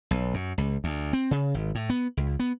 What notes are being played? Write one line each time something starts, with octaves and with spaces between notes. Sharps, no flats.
B1
F#2
C#2
D2
C4
C#3
G#1
A2
B3
C#2
B3